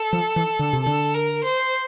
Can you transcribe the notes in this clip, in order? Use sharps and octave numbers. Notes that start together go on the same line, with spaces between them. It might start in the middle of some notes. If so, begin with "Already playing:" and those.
Already playing: A4
F3
E3
D3
C3
D3 A4
A#4
C5